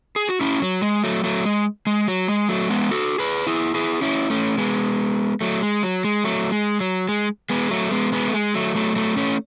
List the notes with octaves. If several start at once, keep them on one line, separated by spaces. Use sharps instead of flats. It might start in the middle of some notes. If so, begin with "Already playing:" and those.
G#4
F#4
C#4 E4
F#3
G#3
F#3 A3
F#3 A3
G#3
G#3
F#3
G#3
F#3 A3
G#3 B3
F#4 A4
G#4 B4
E4 G#4
E4 G#4
C#4 E4
A3 C#4
G#3 B3
F#3 A3
G#3
F#3
G#3
F#3 A3
G#3
F#3
G#3
G#3 B3
F#3 A3
G#3 B3
G#3 B3
A3
G#3
F#3 A3
F#3 A3
F#3 A3
A3 C#4